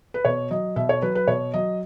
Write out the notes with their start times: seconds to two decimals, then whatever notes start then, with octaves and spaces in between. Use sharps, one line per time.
0.14 B4
0.25 B2 C#5
0.51 F#3 D#5
0.76 B2 E5
0.89 C#5
1.02 F#3 B4
1.15 B4
1.27 B2 C#5
1.54 F#3 D#5